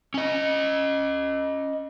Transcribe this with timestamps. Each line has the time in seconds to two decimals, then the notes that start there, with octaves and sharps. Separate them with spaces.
0.14 C#4 D#5